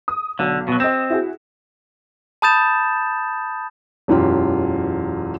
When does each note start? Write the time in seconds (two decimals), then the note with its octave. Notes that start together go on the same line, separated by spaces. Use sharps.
0.08 D#6
0.39 B1 D3
0.68 B2 F#3
0.80 C4 D#5 E7
1.10 E4 F#4 G#4
2.42 A5 B5 D#6 G6 A6 E7
4.08 E1 F#2 E3 F4 G4